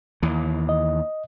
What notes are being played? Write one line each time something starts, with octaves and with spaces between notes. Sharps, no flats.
D#2 E3
D#5